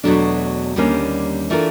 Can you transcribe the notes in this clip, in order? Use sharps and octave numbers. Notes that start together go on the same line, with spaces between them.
E2 B2 F#3 A3 D4
D#2 D3 G3 A#3 C#4
E3 A3 D4 F4 A#4